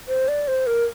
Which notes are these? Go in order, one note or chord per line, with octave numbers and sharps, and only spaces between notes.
C5
D5
C5
A#4